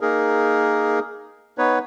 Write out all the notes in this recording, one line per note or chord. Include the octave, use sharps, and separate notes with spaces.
A#3 D#4 G#4 A#4
B3 D#4 B4 C#5